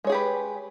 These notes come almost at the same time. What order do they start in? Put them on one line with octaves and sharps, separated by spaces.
G#3 C#5 G#4 G4 B4